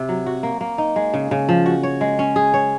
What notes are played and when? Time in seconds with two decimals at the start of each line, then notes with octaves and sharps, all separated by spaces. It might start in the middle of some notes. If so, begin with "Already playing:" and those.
Already playing: C3
0.09 F#3
0.26 F#4
0.43 A#3
0.61 A#3
0.78 D#4
0.96 G#3
1.14 C#3
1.31 C#3
1.49 F3
1.66 F#4
1.83 C#5
2.01 G#3
2.19 C#4
2.36 G#4
2.54 C#5